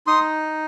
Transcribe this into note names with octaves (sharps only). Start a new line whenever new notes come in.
D#4 C6 D#6